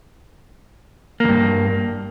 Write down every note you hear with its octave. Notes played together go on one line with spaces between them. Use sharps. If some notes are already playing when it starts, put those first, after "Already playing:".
E2 G2 A#3